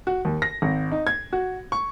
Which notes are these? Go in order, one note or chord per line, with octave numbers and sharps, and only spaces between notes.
F#4
D#2
A#6
G#1
D#4
G#6
F#4
C#6